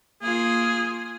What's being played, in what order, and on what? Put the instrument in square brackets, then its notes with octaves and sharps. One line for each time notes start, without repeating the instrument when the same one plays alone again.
[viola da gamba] A#3 F4 [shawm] G#4